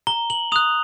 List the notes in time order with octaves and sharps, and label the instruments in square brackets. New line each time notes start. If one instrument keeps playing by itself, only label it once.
[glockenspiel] A#5 G7
F#7
D#6 F#6 F7